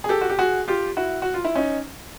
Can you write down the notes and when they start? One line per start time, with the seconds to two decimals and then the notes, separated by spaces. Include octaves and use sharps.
0.04 G#4
0.09 G4 A4
0.21 F#4
0.30 G4
0.39 F#4 G#4
0.68 F4 G4
0.97 E4 F#4
1.22 F#4
1.34 F4
1.45 E4
1.56 C#4 D#4